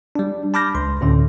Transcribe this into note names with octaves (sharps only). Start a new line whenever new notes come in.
G3 D4
A5 B5 D6 F6 G6 A#6
C#2 C6
D2 A2 D3 C#4